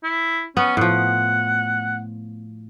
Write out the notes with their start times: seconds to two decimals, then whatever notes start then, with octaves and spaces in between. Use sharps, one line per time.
0.03 E4
0.57 B3 C#4
0.77 A2 F3 F#5